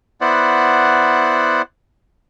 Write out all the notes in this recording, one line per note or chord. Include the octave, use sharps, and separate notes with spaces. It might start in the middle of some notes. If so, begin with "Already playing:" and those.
B3 E4 C5 D5 F#5